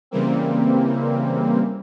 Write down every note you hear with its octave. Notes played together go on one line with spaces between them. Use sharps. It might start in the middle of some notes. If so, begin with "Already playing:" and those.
C#3 E3 G3 A#3 C4